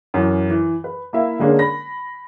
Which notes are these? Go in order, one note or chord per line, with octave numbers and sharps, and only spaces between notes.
F#2 E3
E3
B4
A#3 E4 E5 F5
D3 G#3 A#3 C#4 D4
B5 A#6